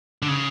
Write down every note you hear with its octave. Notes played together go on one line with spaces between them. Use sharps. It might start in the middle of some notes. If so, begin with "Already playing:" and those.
D3
C#3